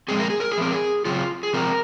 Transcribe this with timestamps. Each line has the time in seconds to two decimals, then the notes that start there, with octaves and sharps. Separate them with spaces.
0.08 F3 G#3 C4 G#4
0.20 A#4
0.30 G#4
0.40 A#4
0.51 G#4
0.58 F3 C4 A#4
0.72 G#4
1.05 C#3 F#3 C4 F4
1.43 G#4
1.53 C3 F3 C4 A#4